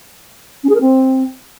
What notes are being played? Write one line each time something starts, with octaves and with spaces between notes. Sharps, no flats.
C#4
G#4
A#4
C4